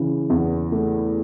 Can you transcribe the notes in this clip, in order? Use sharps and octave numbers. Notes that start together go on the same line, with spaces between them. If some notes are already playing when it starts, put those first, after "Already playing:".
Already playing: C#3 E3
E2
A3